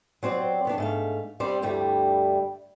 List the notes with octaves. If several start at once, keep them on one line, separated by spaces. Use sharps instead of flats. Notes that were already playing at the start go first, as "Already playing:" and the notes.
F#3 C4 C5 D5
A2 B3 D4
G#2 A3 F5
G3 C4 C5 D5
D2 G2 G3 A3 E4 G5